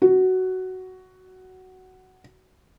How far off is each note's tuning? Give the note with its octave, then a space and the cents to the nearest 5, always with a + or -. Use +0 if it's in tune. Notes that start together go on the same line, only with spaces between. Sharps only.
F#4 +10